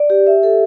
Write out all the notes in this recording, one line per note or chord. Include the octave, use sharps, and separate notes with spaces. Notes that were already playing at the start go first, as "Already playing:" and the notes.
Already playing: D5
G4
E5
A4